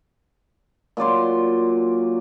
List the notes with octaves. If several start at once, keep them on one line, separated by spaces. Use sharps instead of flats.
A#2 F#3 D5 C6